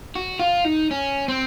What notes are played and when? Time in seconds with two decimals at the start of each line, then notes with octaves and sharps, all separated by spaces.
0.15 F#4
0.39 F4
0.65 D#4
0.91 C#4
1.28 C4